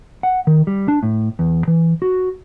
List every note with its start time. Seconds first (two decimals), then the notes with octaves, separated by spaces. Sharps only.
0.23 F#5
0.47 D#3
0.67 G3
0.88 D4
1.03 A2
1.39 E2
1.68 E3
2.02 F#4